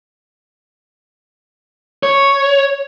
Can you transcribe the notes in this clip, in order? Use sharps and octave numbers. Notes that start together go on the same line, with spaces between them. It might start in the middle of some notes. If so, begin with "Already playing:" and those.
C#5